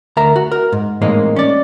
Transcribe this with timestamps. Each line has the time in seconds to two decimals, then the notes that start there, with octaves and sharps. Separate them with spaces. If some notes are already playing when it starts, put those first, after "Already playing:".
0.17 D2 A#4 E5 A#5
0.36 F#4
0.52 A#4
0.72 G#2
1.02 A2 E3 G#3 A#3 C4 D#4
1.36 C#4 D5